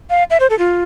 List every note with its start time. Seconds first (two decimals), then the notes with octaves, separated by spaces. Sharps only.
0.10 F5
0.30 E5
0.40 C5
0.50 A4
0.59 F4